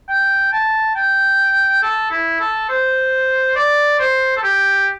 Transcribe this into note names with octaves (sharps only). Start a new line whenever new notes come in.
G5
A5
G5
A4
E4
A4
C5
D5
C5
A4
G4